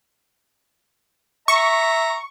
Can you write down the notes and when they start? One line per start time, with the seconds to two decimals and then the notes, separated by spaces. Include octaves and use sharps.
1.48 E5 A#5 C#6